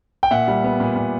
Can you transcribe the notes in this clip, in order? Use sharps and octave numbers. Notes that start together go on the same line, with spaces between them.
G5
A#2 E5 F#5
G3
B3
A#2
A#2